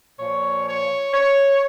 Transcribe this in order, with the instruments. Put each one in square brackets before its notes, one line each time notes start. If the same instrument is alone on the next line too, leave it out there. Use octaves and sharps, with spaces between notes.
[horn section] A#2 F3 C#5
C#5
C#5